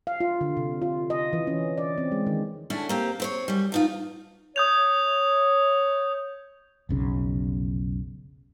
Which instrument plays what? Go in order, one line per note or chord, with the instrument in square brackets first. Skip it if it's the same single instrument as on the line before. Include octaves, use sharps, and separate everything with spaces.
[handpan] F5
F4
D3
C3
F4
D#5
E3
C#4
D5
C4
G#3
D#3
[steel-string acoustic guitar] D2 C#4 D4 E4
A#3 C4 G4
C4 C5 C#5
F#2 G3
G2 D#4 F4
[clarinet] C#5 [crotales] D#6 G6 F7
[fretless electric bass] F1 B1 C#3